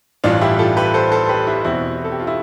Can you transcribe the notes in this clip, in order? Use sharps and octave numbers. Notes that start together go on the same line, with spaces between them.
A1 G2 E3 D4 F4
E4 G4
F4 A4
G4 B4
A4 C5
A4 C5
G4 B4
E4 G4
E2 B2 C4 E4
A4
G4
F4
E4